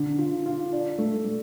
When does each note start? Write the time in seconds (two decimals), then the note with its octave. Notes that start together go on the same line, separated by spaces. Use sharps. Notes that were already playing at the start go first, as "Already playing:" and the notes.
Already playing: D3
0.18 F4
0.46 F4
0.73 D4
0.98 A3
1.25 A3